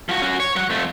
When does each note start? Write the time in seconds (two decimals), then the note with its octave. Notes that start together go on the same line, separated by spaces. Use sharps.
0.09 F3 F#4
0.22 C#4 F#4
0.40 C#5
0.56 F#3 F#5
0.70 F2 A3